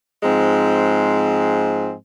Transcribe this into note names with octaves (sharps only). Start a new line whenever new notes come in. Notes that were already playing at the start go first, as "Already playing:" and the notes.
G#2 F3 G#3 C4